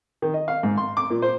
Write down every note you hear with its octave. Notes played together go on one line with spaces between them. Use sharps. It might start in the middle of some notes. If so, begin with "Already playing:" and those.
D#3
D#5
F5
G#2
C6
D6
A#2
C5